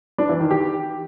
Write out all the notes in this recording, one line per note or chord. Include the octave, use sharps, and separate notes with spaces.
D4
E3
D#3
G4